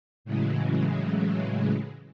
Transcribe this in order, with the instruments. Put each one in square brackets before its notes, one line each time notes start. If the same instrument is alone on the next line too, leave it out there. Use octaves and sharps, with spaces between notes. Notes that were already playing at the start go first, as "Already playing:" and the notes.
[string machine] A2 C#3 E3 F#3 G#3